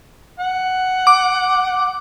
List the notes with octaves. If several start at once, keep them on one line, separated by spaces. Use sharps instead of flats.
F#5
D6